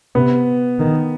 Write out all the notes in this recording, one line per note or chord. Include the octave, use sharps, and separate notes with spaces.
C3 B3
D#3